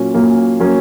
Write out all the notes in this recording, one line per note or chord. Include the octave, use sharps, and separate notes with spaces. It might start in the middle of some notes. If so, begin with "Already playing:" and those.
Already playing: A#2 F#3 A#3 C#4
A#2 F#3 A#3 C#4
F#3 A#3 C#4